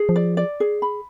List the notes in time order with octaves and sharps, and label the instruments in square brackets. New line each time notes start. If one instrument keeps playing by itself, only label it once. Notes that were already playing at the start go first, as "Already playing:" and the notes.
Already playing: [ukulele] G#4
[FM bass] F3
[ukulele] D5
D5
G#4
B5